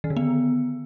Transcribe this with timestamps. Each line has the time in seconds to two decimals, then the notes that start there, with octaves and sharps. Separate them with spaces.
0.04 D#3
0.10 D3
0.16 B3